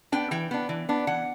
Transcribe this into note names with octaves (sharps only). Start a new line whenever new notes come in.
B3 D4 G5
E3 G5
B3 D4
E3
B3 D4
E3 F#5